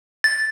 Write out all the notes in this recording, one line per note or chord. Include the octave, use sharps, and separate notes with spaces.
A6